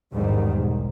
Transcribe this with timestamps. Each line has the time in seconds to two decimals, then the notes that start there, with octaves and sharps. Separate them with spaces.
0.14 A1 E2 G#2 D#3 G3
0.54 B1